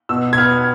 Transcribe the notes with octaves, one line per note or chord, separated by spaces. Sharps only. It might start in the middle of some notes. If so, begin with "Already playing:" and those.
B2 E6
G#6
B3 F6